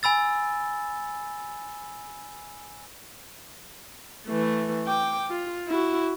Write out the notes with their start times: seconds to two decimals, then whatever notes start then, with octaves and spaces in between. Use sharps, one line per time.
0.03 G#5 B5 E6 A6
4.27 E3 A3
4.87 G5 D6
5.30 F4
5.68 E4 F#4